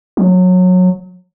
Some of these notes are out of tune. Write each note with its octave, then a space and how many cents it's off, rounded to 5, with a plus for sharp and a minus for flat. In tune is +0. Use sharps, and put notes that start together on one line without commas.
F#3 -20